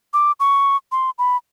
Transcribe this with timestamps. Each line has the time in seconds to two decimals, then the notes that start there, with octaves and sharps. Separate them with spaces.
0.13 D6
0.40 C#6
0.92 C6
1.18 B5